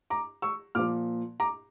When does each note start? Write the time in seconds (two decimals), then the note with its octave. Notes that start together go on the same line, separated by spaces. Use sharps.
0.10 A#5 D6
0.42 C#6 E6
0.75 A#2 F3 D6 F6
1.40 A#5 D6